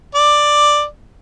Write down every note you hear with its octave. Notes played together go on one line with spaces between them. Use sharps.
D5